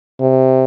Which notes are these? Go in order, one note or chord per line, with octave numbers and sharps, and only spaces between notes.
C3